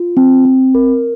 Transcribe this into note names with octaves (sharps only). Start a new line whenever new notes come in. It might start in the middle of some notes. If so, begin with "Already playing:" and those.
Already playing: F4
C4
C4
A#4